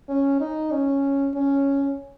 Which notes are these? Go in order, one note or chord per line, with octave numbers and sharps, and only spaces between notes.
C#4
D#4
C#4
C#4